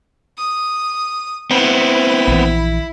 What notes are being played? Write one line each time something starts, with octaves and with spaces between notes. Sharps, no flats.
D#6
B3 C4 E4
A#1 E3